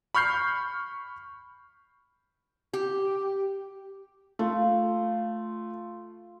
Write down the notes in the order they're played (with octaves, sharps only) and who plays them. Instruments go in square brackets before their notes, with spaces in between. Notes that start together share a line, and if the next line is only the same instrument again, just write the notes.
[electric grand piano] B5 C#6 F6 G6 C7
[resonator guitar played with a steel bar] G4
[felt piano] A3 [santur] F4